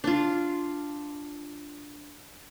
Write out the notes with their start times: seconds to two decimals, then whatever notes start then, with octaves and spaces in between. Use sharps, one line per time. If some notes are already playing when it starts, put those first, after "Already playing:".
0.04 D4 F4